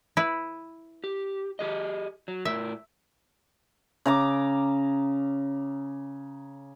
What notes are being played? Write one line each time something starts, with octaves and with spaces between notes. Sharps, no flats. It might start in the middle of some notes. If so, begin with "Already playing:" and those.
E4 B4
G4
G4 G#4 D#5
F#3
A2 A#4 E5
C#3 A#5 D6